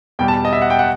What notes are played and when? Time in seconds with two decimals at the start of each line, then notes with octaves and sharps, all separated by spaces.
0.19 E2 B2 G3 G5
0.28 A5
0.45 D#5
0.53 E5
0.62 F#5
0.70 G5
0.79 F#5